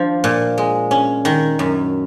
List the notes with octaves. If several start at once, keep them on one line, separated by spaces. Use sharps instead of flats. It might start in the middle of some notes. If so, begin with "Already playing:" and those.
Already playing: F3 D4
A#2
G#3
C#4
D#3
F#2